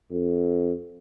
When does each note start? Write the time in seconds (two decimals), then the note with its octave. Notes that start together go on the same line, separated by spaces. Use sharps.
0.11 F2